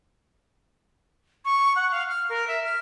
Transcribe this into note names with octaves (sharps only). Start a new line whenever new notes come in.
C#6
F#5
F5
F6
A#4
E5
F6